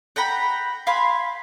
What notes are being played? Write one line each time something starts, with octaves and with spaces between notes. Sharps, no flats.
F#5 G5 A#5 B5
F5 G#5 B5 C6